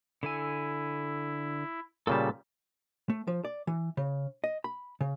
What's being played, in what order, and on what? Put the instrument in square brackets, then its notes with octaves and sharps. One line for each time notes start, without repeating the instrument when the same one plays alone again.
[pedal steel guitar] D3 A4 G#5 [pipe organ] E4
[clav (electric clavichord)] A#2 C#3 G3 [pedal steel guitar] A4 A5
[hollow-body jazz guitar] A3
F3
D5
E3
C#3
D#5
B5
C#3